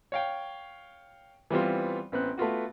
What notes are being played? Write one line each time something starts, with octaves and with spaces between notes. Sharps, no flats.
C#5 F5 G5
E3 G3 B3 C4 F4
A1 B3 C4 F#6
A3 B3 F4 F#4